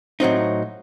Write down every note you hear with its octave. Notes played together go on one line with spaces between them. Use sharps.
A2 F#3 C4 D#4